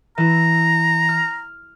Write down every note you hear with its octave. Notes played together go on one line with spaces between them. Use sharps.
E3 E4 A#5
F6